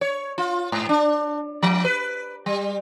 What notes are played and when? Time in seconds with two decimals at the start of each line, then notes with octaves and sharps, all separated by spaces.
0.01 C#5
0.38 F4
0.72 G#2
0.89 D4
1.63 F3
1.85 B4
2.46 G3